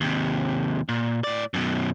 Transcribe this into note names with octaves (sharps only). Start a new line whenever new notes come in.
D#2 C3
A#2
A2 D5
F#2 B2